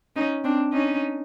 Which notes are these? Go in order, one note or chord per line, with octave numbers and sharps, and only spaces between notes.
C#4 D#4
C4 D4
C#4 D#4